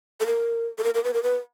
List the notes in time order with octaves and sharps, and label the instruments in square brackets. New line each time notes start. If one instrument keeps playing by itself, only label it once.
[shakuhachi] A4
A#4
A4
A#4
A#4
B4
A#4
B4